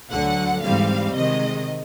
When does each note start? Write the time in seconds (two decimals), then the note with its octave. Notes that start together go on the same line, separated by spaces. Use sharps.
0.10 D2 D3 F#3 F#5
0.62 G#2 E3 G3 C4 F5
1.14 C3 D#3 G#3 D#5